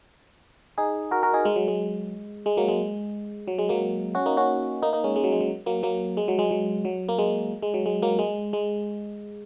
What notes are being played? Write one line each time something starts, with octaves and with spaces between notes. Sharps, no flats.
D#4 G#4
F#4 A#4
F#4 A#4
D#4 G#4
G#3
F#3
G#3
G#3
F#3 A#3
G#3
F#3
G#3
F#3 A#3
C#4 F#4
A#3 D#4
C#4 F#4
A#3 D#4
A#3 D#4
G#3 C#4
G#3
F#3
G#3
F#3
F#3 A#3
F#3 A#3
G#3
F#3
G#3
F#3
F#3
A#3
G#3
G#3
F#3
G#3
F#3 A#3
G#3
G#3